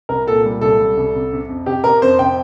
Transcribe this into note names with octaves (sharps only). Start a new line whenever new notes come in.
C2 A#4
A#2 A4
G3
C2 A4
G3
C2
C3
C3
F2
C3 G4
C3 A#4
F2 C5
C3 G5